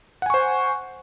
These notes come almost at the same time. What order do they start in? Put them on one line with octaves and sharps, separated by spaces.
F#5 G#5 C#6 C5